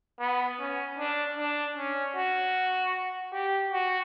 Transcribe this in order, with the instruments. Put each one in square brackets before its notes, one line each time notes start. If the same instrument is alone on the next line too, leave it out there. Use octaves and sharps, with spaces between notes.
[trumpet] B3
C#4
D4
D4
C#4
F#4
G4
F#4